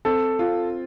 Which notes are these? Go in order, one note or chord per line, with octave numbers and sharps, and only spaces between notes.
C4 A4
F4